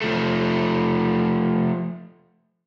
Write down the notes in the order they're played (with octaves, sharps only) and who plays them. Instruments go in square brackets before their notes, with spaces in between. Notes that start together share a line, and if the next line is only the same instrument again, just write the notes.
[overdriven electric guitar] F3 A3